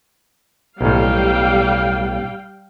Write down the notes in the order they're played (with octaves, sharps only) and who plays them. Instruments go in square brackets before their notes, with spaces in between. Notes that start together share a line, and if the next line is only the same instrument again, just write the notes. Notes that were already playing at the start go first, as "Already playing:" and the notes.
[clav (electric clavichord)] B1 A2 [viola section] G3 F5 G5